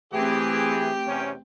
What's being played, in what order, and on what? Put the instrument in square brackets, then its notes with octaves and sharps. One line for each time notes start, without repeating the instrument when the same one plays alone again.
[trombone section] E3 G#4 [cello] A3 C4 [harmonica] G4 G5
[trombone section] E2 C3 C#4